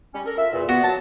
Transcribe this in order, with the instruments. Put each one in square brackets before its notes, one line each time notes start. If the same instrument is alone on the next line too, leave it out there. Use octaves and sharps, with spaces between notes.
[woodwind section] G3 C#4
A4 A#4
F4 E5
E2 A#2
[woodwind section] A#2 B3 [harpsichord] F#4
[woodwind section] F#3 A5